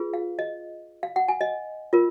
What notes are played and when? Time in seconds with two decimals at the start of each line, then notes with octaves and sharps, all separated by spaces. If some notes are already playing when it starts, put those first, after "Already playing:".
Already playing: F4 G#4 B4
0.14 F5
0.39 D#5
1.03 F5
1.16 F#5
1.28 G#5
1.41 D#5
1.93 F4 A#4